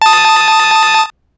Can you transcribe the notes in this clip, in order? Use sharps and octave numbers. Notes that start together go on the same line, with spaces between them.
A5 D#6